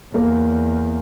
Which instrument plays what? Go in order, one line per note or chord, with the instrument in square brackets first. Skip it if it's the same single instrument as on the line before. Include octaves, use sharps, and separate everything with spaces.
[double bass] E2 [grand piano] A#3